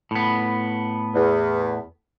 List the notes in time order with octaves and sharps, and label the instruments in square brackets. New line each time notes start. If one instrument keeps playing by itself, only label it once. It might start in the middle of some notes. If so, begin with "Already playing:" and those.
[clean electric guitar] A2 B3
[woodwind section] E2